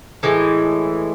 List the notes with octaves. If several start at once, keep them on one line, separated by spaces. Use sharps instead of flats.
A2 E3 G#3